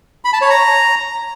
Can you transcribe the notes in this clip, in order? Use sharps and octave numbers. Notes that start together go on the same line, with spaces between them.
B5
A5
C#5
A#5